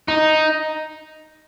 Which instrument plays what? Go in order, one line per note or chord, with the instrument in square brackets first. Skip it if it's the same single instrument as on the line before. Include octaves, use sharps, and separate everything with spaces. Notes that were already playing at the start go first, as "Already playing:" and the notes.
[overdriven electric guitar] D#4